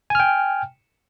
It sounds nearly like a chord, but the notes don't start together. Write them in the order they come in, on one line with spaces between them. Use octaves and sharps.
G#5 F6 G5